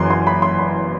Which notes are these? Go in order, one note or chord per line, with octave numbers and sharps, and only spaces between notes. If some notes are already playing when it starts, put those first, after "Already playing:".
Already playing: F#1 F#2 E3 C6
C6
B5
C6
B5